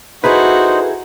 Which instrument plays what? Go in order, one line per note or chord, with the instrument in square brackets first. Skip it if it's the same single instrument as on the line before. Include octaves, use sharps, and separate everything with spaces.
[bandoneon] D#4 C5 [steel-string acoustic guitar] E4 G#4 A4 [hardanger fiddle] F#4 [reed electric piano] B4